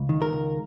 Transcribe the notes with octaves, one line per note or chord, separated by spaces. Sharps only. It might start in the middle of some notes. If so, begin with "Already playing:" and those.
Already playing: C#2
D#3
A#4
C#2